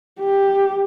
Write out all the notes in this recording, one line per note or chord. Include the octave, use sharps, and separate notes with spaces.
G4